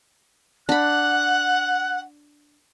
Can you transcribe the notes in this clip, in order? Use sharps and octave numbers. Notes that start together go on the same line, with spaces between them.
D4 F#5 B5 F#6